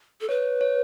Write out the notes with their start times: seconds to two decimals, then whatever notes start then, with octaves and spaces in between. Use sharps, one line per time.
0.21 A4
0.29 B4 C#5
0.61 C#5